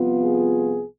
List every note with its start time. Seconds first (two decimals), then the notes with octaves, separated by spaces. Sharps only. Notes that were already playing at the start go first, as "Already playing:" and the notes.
Already playing: C2 C3 F3 B3 F4
0.22 G#4